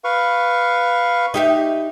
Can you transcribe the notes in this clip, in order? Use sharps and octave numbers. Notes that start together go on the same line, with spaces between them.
B4 F5 C#6
D#4 G4 E5